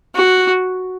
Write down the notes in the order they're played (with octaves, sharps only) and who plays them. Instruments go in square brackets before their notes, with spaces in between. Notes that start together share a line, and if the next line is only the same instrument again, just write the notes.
[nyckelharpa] F#4